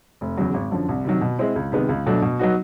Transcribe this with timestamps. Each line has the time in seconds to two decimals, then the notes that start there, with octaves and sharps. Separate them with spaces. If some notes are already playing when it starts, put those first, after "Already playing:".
0.21 F1
0.37 E2 C#3 F#3
0.54 G#1
0.71 F#2 D3 F3
0.89 C2
1.05 C3 D#3 F#3
1.21 B2
1.39 G#3 C4 E4
1.56 C#2
1.72 C3 D#3 G#3 B3
1.89 C#2
2.06 B2 F#3 A3 D4
2.22 B2
2.39 F#3 B3 D#4 F#4